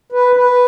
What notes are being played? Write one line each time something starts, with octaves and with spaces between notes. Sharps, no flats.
B4
B4